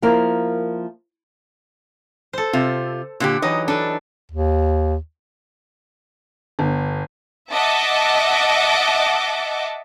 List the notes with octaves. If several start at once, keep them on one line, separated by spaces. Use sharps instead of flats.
F3 A#3 E4 A#4
A4 C5
C3 F4
A#2 D3 F#4 G4
E3 F#3 D#4 D#5
D4 A4 B4
D#2
G1
D#5 E5 F#5 A5 D6